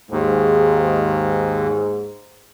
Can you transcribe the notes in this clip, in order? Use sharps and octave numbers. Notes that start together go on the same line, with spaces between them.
D#2 G#2